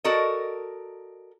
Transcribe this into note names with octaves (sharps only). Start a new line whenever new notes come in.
F#4 A4 A#4 D5 D#5